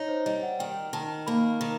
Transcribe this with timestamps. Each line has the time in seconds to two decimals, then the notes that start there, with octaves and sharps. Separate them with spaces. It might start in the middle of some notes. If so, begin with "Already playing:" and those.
Already playing: D#4 C#5 D#5
0.08 C5
0.26 G3 D#5
0.43 F#5
0.59 D#3 G5
0.93 D#3 A5
1.27 A#3 B5
1.61 D#3